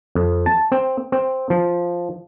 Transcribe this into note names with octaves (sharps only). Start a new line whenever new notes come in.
F2
A5
C4
C4
F3